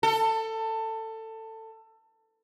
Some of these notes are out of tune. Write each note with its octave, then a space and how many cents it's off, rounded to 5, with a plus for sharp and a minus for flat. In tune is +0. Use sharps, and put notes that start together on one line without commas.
A4 +20